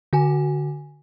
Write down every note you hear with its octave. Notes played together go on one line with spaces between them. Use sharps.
D3 F#4 G#5